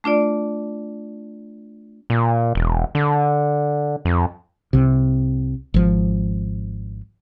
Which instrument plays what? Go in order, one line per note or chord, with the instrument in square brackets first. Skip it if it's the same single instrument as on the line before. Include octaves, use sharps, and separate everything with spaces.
[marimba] A3 D4 F4 D5
[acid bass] A#2
E1
D3
F2
[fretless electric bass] C2 C3
G#1 F3